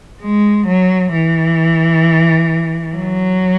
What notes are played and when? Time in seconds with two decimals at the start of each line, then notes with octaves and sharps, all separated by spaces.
0.21 G#3
0.67 F#3
1.13 E3
2.96 F#3